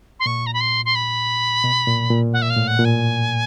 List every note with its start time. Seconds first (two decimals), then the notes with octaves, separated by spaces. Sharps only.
0.20 C6
0.26 A#2 C#6
0.46 A#5
0.53 B5
0.61 C6
0.85 C6
0.95 B5
1.64 B2
1.87 A#2
2.11 A#2
2.33 F#5
2.42 E5
2.50 F5
2.56 A2
2.67 F#5
2.79 A#2
2.85 G#5